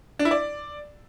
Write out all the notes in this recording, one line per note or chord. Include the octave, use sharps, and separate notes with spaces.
D4
E4
D5